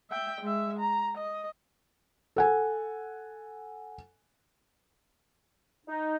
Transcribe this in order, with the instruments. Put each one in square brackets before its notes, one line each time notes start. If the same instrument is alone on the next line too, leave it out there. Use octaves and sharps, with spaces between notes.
[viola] E5 G5
G#3 E5
A#5
D#5
[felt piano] A4 F#5 G#5
[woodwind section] D#4